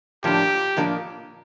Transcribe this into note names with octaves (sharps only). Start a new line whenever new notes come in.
A2 F3 A#3 D4 G4
A2 F3 A#3 D4